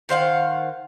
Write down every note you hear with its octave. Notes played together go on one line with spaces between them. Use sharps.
D#3 C5 F5 F#5